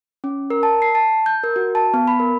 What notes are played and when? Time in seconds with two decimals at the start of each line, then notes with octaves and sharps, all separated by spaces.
0.24 C#4
0.50 A#4
0.63 A5
0.82 C7
0.95 A5
1.26 G6
1.44 A#4
1.56 F#4
1.75 A5
1.94 B3
2.08 B5
2.20 A#4